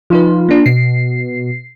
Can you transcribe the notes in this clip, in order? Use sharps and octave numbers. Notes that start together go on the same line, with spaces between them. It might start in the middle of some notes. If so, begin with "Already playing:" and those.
F3 D#4 F4 B4
A#3 D4
B2 C7